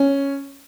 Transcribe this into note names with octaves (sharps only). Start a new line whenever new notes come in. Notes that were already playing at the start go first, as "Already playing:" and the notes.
Already playing: C#4